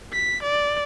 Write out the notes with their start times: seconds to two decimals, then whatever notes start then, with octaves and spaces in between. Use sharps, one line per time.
0.13 B6
0.43 D5